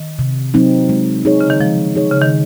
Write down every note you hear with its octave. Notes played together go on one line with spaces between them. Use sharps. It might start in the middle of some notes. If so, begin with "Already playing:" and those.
Already playing: D#3
C3
F#3 C4 D#4
G#3
D#4 G#4 C#5
C#3
D#3
F3 G#3
D#4 G#4 C#5
C#3
D#3